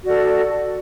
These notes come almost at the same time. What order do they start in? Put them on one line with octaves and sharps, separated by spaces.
F#4 D5 A4